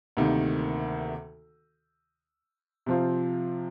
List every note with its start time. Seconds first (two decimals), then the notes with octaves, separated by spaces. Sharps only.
0.17 D2 C3 D#3 A#3
2.86 C3 F3 C4 F4